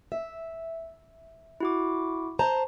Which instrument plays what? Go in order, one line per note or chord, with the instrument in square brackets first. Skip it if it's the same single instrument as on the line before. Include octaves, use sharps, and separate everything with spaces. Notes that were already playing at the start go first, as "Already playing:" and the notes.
[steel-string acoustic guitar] E5
[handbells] E4 F#4 D6
[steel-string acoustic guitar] C5 A5 A#5